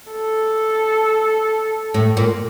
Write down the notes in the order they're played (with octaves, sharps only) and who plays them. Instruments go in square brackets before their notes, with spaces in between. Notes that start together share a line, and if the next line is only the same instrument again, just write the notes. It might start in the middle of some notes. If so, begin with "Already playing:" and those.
[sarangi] A4
[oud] A2
A#2